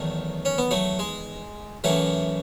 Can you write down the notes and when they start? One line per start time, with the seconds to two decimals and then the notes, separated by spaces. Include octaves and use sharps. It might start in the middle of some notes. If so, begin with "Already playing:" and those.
Already playing: E2 D#3 F#3 A3
0.45 C#4
0.58 B3
0.71 F#3 A3
0.99 G#3
1.84 F#2 E3 F#3 A3